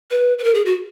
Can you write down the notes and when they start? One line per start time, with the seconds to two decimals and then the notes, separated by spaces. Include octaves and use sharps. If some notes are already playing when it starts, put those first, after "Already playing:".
0.11 B4
0.39 B4
0.44 A#4
0.55 G#4
0.66 F#4